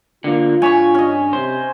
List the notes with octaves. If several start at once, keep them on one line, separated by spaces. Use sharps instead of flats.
D3 A#3 F4
G2 C#5 G#5 B5 C#6
C#4 D#5
C3 C5